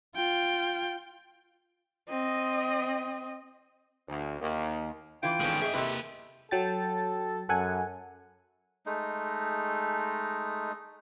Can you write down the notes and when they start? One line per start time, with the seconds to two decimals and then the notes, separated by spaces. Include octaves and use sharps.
0.15 F4 G5
2.09 C4 D#5
4.08 D2
4.40 D#2
5.23 E3 F4 G5
5.40 D3 D#3 G#3 B3 C#4
5.62 G2 G#4 C#5 D#5 E5
5.74 C3 A#3 E4 G4 A4 B4 D#5
6.51 F#3 A4 G5 A6
7.49 F#2 A4 F#5 G#5
8.86 G#3 A3 D#4